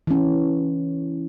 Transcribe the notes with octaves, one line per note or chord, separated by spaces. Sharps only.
E3 C#4